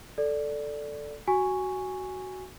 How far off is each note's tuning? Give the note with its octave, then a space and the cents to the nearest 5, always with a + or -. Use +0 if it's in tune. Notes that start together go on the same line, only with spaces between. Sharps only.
A4 +0 D5 +0
F#4 +10 G#5 -5 C#6 +0